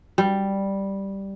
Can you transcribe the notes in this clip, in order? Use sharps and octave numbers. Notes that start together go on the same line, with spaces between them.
G3